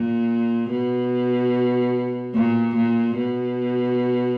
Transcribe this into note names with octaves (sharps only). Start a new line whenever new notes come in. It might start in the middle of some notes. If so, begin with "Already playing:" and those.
Already playing: A#2
B2
A#2
A#2
B2